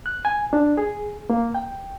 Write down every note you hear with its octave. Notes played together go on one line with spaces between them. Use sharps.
F#6
G#5
D4
G#4
A#3
G5